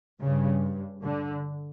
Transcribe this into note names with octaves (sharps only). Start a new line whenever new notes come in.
G2 C#3
D3